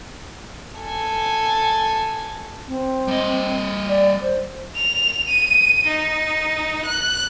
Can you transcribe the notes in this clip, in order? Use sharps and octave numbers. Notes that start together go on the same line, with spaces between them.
A4 G#5
C4
G3 D#5
D5
C5
F7
D#7
D#4
F#6